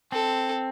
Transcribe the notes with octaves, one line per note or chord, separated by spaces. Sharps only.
C4 A4